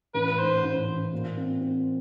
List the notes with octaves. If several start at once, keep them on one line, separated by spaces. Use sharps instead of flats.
A1 B4
G#2 C5
A1
A1
A#2
C4
C4